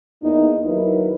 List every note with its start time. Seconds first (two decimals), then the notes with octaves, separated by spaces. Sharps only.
0.23 E2 A#3 D#4
0.65 D#2 F#3 D#4 E4 A#4 B4